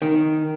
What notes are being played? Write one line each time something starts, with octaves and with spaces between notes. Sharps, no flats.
D#3